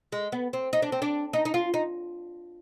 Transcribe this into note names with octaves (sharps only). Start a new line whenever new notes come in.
G#3
B3
C4
D#4
D4
C4
D4
D#4
D#4
F4
D#4